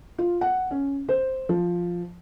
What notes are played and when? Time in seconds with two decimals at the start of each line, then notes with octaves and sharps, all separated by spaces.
0.18 F4
0.41 F#5
0.71 C#4
1.09 C5
1.49 F3